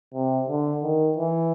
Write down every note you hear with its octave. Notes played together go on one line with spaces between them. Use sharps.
C3
D3
D#3
E3